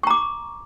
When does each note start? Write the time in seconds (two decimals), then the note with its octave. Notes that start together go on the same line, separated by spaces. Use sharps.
0.03 C#6
0.07 A#5
0.10 D6